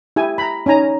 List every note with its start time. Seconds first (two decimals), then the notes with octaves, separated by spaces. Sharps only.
0.16 E4 G4 G#5
0.38 A#5 B5
0.66 C#4 D#4 G#5 A#5